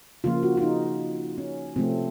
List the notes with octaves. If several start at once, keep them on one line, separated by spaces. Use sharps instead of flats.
C#3 F3 A#3 F4
F#4
F4
D#4
C#4
C3 F3 A3 C4